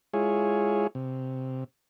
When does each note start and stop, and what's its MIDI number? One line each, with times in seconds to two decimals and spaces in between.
0.13 0.87 56
0.13 0.87 64
0.13 0.87 65
0.13 0.87 68
0.13 0.87 73
0.95 1.64 48